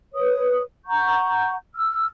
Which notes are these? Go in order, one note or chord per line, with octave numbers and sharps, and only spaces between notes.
B4 C#5 D#6
F#5 A#5 C#6 G6
E6 F6